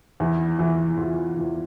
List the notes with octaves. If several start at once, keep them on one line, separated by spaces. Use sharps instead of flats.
E2 E3 E4
E2 E3
E2 E3 F4
E2 E3